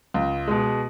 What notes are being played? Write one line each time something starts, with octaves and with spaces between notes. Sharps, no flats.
C#2
B2 G#3